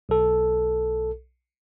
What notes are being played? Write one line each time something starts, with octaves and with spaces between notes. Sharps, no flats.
B1 A4